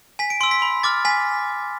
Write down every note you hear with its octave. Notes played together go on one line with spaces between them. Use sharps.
G#5 B6
D7
C6 E6 D7
B6
B5
D6 F6 A6
G#5 B6